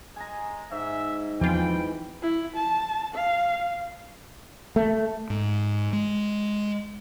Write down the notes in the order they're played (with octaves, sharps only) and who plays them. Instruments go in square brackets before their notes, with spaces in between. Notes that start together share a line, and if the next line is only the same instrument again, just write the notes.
[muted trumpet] G#3 [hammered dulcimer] G#5 A#5
[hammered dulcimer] G#2 [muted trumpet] E5
[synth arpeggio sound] E2 F4 [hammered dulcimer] E3 B5 [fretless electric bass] F3 C4 [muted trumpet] G5
[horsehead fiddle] E4
A5
F5
[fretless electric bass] A3
[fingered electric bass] G#2
G#3